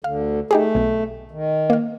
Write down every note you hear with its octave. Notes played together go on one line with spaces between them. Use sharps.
D2 D3 F5
A3 D#4 G4 G#4
B1 B2
D#3
A#3 F5